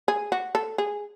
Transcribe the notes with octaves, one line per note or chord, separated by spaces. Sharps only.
G#4
F#4
A4
G#4